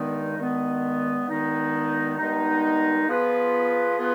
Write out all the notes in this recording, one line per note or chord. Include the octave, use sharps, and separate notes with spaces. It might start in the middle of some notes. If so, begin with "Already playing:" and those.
Already playing: G2 D#3 G#3 B3 D#4
G2 D#3 G#3 B3 D#4
G2 D#3 G#3 B3 D#4
G2 D#3 G#3 B3 D#4
F3 B3 F4 G#4 B4
F3 B3 F4 G#4 B4